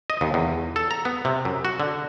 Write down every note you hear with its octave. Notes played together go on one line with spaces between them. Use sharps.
D#5
D#2
E2
A4
A#5
B3
C3
F#2
F#4
D3